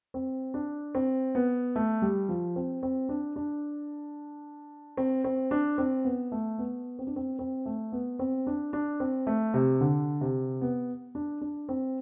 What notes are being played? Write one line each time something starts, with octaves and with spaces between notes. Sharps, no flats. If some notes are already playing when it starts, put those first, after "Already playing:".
C4
D4
C4
B3
A3
G3
F3
C4
C4
D4
D4
C4
C4
D4
C4
B3
A3
B3
C4
D4
C4
C4
A3
B3
C4
D4
D4
C4
A3
C3
D3
C3
B3
D4
D4
C4